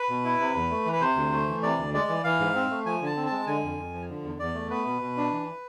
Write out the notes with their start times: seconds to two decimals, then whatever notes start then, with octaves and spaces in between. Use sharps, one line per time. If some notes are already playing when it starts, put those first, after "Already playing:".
Already playing: B4
0.09 B2
0.24 E4
0.40 C3
0.55 E2
0.70 A3
0.86 E3
0.93 B4
1.01 C3 C5
1.16 D2
1.32 A3
1.47 E3
1.62 C3 D5
1.78 D2
1.94 G#3 D5
2.09 E3
2.24 E3 F5
2.40 G#2
2.55 C4
2.70 A3
2.85 F3 G#5
3.01 D3 A5
3.16 C4
3.27 A5
3.32 G#3
3.47 D3 G#5
3.63 F2
3.78 F2
3.94 F3
4.09 D3
4.24 E2
4.39 E2 D5
4.55 A3
4.70 B3 B4
4.86 B2
5.01 B2
5.17 D4
5.32 E3